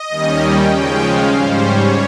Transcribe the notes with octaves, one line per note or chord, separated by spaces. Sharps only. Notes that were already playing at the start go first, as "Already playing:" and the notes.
Already playing: D#5
D#2 D#3 G3 C#4
G5
C#3 F3 G#3 C#4 G5
F5
G#2 G3 C#4 C5
C#5